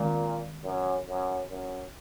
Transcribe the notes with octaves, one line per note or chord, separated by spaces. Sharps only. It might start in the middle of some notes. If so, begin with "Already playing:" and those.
Already playing: A#2 D#3 G#3 C4
F#2
F#2
F#2